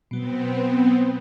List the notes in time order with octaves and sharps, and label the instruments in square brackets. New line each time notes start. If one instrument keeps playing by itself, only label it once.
[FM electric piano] B2 F#3 [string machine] B3 C4